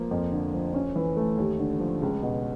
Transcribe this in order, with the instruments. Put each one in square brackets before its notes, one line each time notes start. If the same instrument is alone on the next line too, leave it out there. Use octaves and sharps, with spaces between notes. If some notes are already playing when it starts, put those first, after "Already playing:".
Already playing: [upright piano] F3 A#3
F2
D3
F3
C#4
E3
A3
D#2
D3
F3
C#2
B2